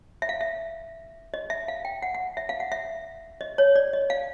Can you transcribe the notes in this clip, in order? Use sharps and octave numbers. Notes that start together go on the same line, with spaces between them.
E5
F5
E5
D#5
E5
F5
G5
F#5
F#5
E5
F5
F#5
E5
D#5
C#5
D5
D#5
F5